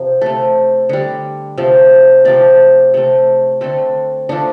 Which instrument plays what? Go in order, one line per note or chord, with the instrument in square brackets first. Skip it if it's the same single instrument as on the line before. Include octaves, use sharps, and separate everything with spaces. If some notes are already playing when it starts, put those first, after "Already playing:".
Already playing: [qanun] C3 F3
C3 A3
D3 G3
C3 F3 A3
C3 F3 A3 D5
C3 A3
D3 A3 C4
D3 F3 A3 D4